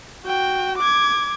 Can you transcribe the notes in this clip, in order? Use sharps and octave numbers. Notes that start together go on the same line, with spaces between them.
F#4 G5
D6 G#6